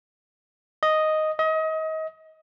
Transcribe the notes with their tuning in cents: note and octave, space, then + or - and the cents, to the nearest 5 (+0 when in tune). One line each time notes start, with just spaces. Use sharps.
D#5 +0
D#5 +30